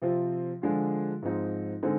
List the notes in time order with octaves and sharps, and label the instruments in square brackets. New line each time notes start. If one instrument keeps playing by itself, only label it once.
[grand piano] C3 F3 C4 F4
D3 F3 G#3 D4 F4
G#2 F3 C4 D#4
D3 G#3 C4 D#4